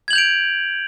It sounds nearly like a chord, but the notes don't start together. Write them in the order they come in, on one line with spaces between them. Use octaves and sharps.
G#6 F#7 G6 F7 D7